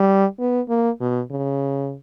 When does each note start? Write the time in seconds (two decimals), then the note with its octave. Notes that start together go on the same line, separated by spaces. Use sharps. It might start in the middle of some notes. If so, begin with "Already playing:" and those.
Already playing: G3
0.39 B3
0.69 A#3
1.00 B2
1.31 C#3